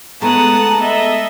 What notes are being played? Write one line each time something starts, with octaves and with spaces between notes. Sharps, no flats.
G#3 A3 B3 A5 A#5 D#6 F#6
A4 D#5 E5